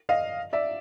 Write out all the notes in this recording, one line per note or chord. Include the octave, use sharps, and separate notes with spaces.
D#5 F5
D5 E5